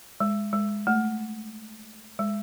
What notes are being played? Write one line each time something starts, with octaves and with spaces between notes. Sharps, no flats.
G#3
G#3
A3
G#3